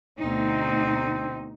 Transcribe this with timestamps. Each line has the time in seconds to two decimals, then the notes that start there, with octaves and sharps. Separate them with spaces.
0.19 D2 B2 C4 D#4